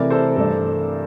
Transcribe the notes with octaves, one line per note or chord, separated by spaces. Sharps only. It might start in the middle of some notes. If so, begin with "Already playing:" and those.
Already playing: C3 E3 A3 E4 A#4 D5
A4 C5
G2 E3 A3 D4 A4